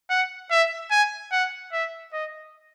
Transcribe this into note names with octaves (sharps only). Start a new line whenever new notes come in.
F#5
E5
G#5
F#5
E5
D#5